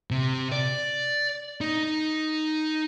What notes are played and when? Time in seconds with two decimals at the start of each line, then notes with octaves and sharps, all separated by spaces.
0.11 C3
0.52 D5
1.61 D#4